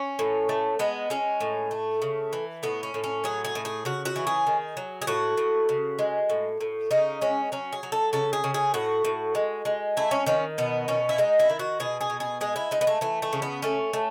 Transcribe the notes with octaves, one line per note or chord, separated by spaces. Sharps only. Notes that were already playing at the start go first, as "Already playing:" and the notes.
Already playing: C#4
A2
A3
G#3 B3
G#3 C#4
A2
A3
C#3
E3
A2 B3
C#4
A2
C#4
F#3 G#4
G#4
A2
G#4
C#3 F#4
F#4
E3
G#4
D#3
F#3
G#4
A2 F#4
A2
C#3
G#3
A2
A2
C#3 D#4
G#3 C#4
F#3 C#4
G#4
F#3
A4
C#3 A4
G#4
C#3
G#4
A2 F#4
A2
G#3
G#3
A3 E4
C#4
D#3 C#4
B2 B3
B2 C#4
E4
G#3 D#4
E4
D#3
F#4
B2 G#4
G#4
B2
G#4
G#3 G#4
E4
G#3 D#4
B3
A3
E3 A3
A3
C#3
B3
A3 C#4
A3